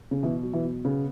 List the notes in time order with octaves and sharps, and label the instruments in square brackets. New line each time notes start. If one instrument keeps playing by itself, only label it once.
[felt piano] C#3
[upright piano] B2 [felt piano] E3
[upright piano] F#3
[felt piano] E3
[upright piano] B2
[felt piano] C#3 [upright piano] B3